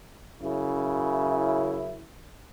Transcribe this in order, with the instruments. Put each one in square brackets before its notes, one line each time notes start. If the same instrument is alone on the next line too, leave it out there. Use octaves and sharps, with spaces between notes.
[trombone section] F#2 C#3 E4